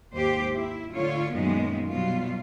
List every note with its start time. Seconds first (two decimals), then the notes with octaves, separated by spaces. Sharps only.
0.15 D#2 G#2 G4 C5
0.55 E4
0.94 A2 D3 F4 C#5
1.34 F#2 A#2 D#3 G#3 B3
1.92 B2 F#3 G3 B3 F4